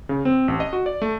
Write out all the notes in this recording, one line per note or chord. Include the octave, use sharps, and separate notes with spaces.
C#3
C4
A1
D#5
F#4
D5
A3